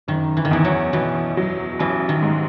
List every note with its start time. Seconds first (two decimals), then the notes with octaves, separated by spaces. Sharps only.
0.08 F#1 D#3
0.37 E3
0.45 D#3
0.51 E2 E3
0.65 F#3
0.93 B2 E3
1.37 F#3
1.79 A1 E3
2.09 D#3
2.22 G#2